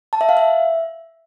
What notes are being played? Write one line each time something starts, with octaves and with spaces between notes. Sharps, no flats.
A5
E5
F5
E5